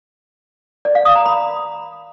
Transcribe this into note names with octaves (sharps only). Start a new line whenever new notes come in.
D5
F5
D#6
A#5
B5